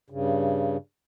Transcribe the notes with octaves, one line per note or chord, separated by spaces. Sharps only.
G2 C#3